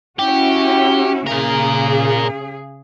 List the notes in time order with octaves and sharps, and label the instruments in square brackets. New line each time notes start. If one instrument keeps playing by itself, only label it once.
[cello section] C#4 E4 F#4 [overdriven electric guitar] G4
[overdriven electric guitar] A#2 A#4 [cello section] C#3 G#4